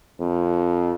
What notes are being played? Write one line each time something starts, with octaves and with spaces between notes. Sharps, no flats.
F2